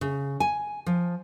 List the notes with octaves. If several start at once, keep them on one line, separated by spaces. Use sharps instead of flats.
C#3
G#5
F3